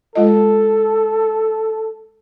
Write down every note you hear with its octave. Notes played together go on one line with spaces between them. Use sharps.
G#3 F4 A4 D#5